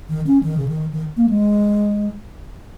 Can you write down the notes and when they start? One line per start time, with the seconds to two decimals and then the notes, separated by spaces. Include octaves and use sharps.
0.10 D#3
0.27 C#4
0.43 D#3
0.57 C#3
0.68 D#3
0.92 D#3
1.17 A#3
1.30 G#3